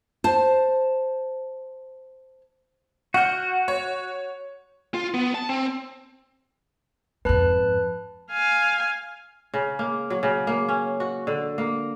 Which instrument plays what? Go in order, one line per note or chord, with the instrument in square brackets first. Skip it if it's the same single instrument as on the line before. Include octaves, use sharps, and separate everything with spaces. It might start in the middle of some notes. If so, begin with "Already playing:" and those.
[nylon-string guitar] C5 A5
[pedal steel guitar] F#4 [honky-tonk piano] F#5 F6 G6
[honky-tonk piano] C#5
[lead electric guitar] F4
B3
A5
C4
[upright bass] F2 G#2 [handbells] B4 A5 F#6
[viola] F5 G#5
[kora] C#3
A#3
F#3
C#3
A#3
C#4
F#4
D3
A#3